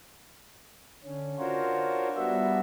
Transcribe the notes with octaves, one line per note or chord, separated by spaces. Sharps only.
D3 C#4
D4 F4 F#4 A#4 C5 C#5
G3 B3 D4 F#4 E5